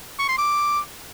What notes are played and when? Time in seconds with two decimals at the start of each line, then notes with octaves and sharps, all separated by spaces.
0.19 C#6
0.29 C6
0.38 D6